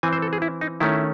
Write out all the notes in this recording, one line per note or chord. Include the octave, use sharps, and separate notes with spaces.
E3 C4 G#5
C5
A4
G#4
E4
D#4
D#3 A3 C#4 E4